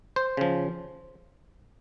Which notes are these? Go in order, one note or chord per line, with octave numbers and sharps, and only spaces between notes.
C5
C#3 F3